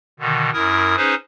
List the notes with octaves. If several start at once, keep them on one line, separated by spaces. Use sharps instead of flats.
B2 D3 D#3
F#2 E4 A#4 D#6
C#4 D#4 G#4 B4 C5